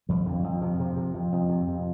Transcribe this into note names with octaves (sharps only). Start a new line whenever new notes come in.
F2 F3
F2 D3
F2
C3 F3
C3
C3
F2
F2
C3
F2